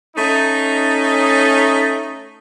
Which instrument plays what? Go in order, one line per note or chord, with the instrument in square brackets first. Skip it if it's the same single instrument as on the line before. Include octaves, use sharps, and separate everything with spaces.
[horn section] A3 C#4 D#4